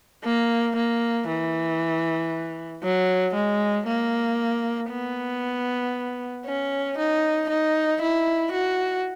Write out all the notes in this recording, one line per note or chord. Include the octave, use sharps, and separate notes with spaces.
A#3
A#3
E3
F#3
G#3
A#3
B3
C#4
D#4
D#4
E4
F#4